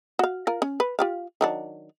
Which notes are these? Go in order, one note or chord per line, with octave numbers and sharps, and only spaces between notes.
F#4 F5
F4 A#4
C#4
B4
F4 G4 F5
D#3 F#3 D4